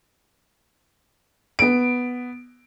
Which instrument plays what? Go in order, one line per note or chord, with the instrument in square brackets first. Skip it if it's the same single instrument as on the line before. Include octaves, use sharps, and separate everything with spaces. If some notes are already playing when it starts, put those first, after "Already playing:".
[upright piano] B3 D7